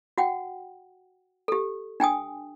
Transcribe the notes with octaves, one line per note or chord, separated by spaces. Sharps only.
F#4 F#5 G5
G4 A4
D4 G5 G#5 D#6